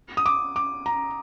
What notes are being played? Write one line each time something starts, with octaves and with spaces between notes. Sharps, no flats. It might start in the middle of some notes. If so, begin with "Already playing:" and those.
D#6
D6
D6
A#5